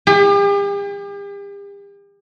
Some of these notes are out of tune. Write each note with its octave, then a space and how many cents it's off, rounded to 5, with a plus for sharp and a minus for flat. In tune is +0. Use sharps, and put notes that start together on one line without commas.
G4 +40